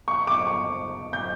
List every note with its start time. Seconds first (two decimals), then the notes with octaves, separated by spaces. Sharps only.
0.08 C#6
0.27 D6
0.47 C#6
1.13 G6